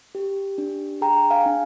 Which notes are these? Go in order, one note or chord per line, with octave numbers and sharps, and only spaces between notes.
G4
D4
G#4 G5 A#5
F5 G#5
D4